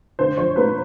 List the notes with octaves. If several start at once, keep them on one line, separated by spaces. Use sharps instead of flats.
D3 C5
F3 C#5
A#3 B4